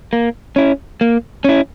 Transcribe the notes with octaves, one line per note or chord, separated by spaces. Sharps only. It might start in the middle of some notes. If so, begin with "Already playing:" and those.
A#3
C#4 E4
A#3
C#4 E4